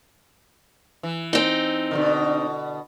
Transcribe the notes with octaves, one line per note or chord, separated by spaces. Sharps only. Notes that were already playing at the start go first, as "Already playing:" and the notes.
E3
C4 D#4
B2 D3 D#3